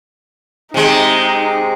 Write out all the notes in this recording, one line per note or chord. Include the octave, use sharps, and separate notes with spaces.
C3 G#3 D#4